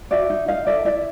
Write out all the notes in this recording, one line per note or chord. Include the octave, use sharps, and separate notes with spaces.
F#4 D5 E5
D#4
D#4 D#5 F5
A4 D5 E5
E4 D5 E5